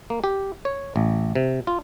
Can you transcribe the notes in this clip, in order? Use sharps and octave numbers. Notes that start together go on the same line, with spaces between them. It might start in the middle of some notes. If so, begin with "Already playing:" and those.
A#3
G4
C#5
A1
C3
F4